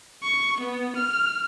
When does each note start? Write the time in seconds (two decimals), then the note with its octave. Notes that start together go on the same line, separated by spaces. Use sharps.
0.23 C#6
0.60 B3
0.96 F6